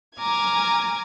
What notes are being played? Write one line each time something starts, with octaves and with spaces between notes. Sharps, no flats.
G#5 A#5 D6 F6 G#6